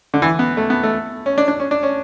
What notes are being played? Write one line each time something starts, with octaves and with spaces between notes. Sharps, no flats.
D3
E3
B3
A3
B3
A3
C#4
D4
D4
C#4
D4
C#4